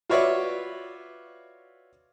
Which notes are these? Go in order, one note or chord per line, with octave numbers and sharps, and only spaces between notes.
F4 F#4 B4 C#5 D5 E5